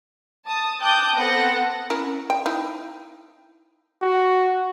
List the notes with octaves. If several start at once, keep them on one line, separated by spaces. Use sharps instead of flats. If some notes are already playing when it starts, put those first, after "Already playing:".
A5 D#6
G5 A5 D6 D#6 F#6 G6
B3 C4 A4 F#5 A#6
C#4 E4 A#4
G5
D#4 E4
F#4